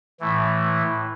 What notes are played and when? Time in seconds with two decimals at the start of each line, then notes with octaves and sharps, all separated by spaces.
0.20 A2 E3 A3